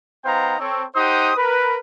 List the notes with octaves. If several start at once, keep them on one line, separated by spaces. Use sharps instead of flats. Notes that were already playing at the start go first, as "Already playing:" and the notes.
B3 D#4 C5 F5 G5 A#5
C4 A4 C#5
D#4 G4 C5 F#5 D#6
A#4 B4